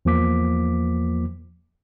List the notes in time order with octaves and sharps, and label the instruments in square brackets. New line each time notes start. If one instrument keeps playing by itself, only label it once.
[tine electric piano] E2 F3 A#3 D6 B6